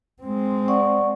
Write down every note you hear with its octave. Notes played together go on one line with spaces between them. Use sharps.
G#3 C4
D5 F#5 C#6